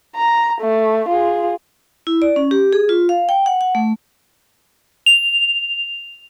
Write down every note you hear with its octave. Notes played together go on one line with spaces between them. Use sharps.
A#5
A3
F4 G#4
E4
D5
C#4
G4
G#4
F4
F5
G5
F#5
F#5
A3
F7